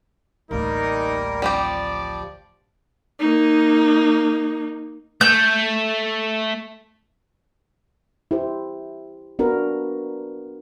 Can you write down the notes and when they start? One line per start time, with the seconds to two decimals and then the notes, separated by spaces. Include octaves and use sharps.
0.51 A1 D2 G3 A#3 D#4 A#4
1.42 F3 G3 C4 G4 D5
3.20 A#3 D#4
5.21 A3 G6
8.31 E4 G4 C5
9.39 B3 D4 F#4 A#4 B4